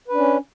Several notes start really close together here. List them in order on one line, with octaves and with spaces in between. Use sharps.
B4 D4 C#4